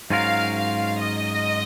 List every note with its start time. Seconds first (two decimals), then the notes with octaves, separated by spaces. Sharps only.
0.10 G#2 F#3 C#4 F4 A#4 F5
0.55 F5
1.00 D#5